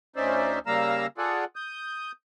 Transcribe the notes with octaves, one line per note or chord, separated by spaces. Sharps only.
D2 C#4 D#4 C5 D5 E5
C#3 G3 A#3 F5 A#5 E6
F4 G#4 A4 D5 F#5
D#6 G6